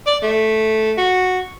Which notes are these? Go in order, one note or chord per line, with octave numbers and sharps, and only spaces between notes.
D5
A3
F#4